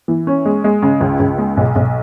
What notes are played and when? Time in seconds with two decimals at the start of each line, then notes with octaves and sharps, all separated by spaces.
0.08 E3
0.27 C#4
0.45 G#3
0.64 G#3
0.82 C#3
1.01 C#2
1.20 C#2
1.38 G#3
1.57 B1
1.76 B1